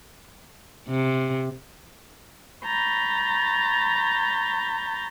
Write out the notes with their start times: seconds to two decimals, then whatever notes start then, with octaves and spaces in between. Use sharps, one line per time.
0.89 C3
2.64 A#5 B5 C#6 G6 A6